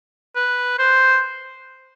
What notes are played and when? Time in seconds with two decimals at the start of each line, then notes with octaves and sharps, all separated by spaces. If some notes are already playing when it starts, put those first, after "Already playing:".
0.35 B4
0.79 C5